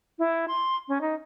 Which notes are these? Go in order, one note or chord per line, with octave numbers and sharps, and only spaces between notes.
E4
C6
C#4
D#4